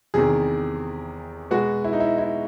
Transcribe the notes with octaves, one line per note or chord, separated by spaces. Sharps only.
E2 C3 D#3 G#4
B2 G#3 B3 F#4
E4
D#4
E4
E4